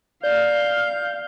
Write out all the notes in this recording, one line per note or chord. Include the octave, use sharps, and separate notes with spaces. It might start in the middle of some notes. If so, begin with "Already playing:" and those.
D5 F5 G6